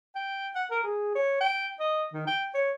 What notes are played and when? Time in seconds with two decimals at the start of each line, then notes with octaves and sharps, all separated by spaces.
0.15 G5
0.55 F#5
0.70 A#4
0.84 G#4
1.15 C#5
1.41 G5
1.80 D#5
2.13 D#3
2.27 G5
2.54 C#5